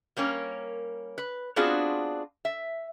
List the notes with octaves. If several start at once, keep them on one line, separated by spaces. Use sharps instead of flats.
G3 A#3 C#4 A#4
B4
B3 C4 D4 F4 F#4 G#4
E5